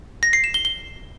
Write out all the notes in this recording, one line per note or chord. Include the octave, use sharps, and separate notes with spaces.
A#6
C7
E7
G7
G7